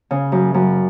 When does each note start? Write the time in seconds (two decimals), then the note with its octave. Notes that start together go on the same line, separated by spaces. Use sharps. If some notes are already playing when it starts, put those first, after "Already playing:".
0.11 C#3
0.32 F#2
0.54 F#2